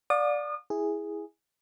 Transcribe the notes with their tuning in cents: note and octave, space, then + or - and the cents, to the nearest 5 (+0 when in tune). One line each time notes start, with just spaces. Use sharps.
D5 +0 F5 +40 D#6 -35
E4 -10 G#4 -5